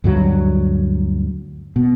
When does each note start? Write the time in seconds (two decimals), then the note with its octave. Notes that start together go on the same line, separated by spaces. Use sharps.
0.04 D2 G2 F#3
1.76 B2